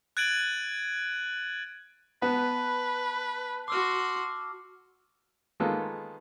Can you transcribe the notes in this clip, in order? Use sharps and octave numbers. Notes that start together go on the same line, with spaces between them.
F#6 G#6 A6 D7 D#7 F#7
B3 B4 A5
F#4 C6 D6 E6 F6
D#3 G#3 A#3 B3 F4 A4